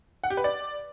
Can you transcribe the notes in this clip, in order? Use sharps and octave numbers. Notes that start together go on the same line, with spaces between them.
F#5
G4
B4
D5